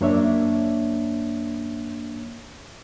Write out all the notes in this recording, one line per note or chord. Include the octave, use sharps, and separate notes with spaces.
F#2 A#3 D4 C#5 E5